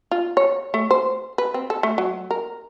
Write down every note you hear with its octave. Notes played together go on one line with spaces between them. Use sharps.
F4
C#5
A3
C5
B4
C4
A4
A3
F#3
A#4